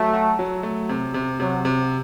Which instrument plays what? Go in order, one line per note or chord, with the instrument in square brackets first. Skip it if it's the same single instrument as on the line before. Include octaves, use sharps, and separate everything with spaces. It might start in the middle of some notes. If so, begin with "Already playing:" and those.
Already playing: [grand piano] F#3 [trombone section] A3
[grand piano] F#4
F#3
A3
C3
C3
[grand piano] C3 [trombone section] F#3
[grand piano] C3